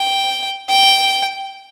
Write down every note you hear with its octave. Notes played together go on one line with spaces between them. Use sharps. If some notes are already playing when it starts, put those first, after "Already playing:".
Already playing: G5
G5